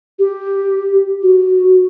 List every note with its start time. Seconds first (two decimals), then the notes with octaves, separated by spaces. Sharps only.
0.19 G4
1.23 F#4